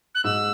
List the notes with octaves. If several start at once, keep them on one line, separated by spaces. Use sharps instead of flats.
F#6
G#2 E6